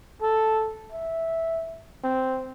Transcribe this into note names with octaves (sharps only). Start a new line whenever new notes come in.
A4
E5
C4